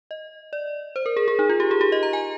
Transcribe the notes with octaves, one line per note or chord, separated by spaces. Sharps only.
D#5
D5
C5
A#4
G#4
G#4
D#4
F4
G4
G#4
G4
D#5
A#5
G#5